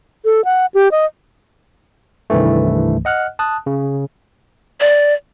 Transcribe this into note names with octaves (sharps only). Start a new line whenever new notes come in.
A4
F#5
G4
D#5
C2 G2 D#3 E3 A3
D#5 F#5 F6 F#6
A5 D#6 F#6
C#3
D5